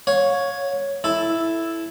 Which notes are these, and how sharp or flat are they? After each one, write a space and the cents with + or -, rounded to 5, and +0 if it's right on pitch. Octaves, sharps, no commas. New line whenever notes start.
C#5 +0 F5 +35
E4 +0 A4 -5